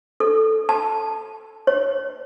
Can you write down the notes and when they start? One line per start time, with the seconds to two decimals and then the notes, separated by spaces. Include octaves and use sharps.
0.20 A4
0.69 A5
1.67 C#5